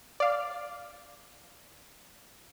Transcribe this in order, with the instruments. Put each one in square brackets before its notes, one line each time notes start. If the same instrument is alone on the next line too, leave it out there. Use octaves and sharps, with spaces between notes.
[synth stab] D5 F5